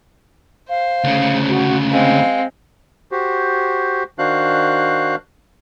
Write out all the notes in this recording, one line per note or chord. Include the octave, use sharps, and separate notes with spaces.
C5 F5
D2 C#3
F#4
G#3 C4 F5
F#4 G4 C5
D#3 D4 F#4 C5 F5 F#6